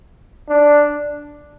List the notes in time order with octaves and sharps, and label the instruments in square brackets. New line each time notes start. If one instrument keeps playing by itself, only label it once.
[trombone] D4